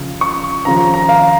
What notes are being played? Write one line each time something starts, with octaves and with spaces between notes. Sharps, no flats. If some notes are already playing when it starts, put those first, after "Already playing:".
Already playing: C#2 C#3 F3
C#6
D#2 C#3 F3 A#5
A#5
F5